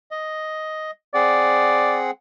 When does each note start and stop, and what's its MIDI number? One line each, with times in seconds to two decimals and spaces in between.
0.11 0.91 75
1.14 2.11 60
1.14 2.11 68
1.14 1.97 74
1.14 2.11 78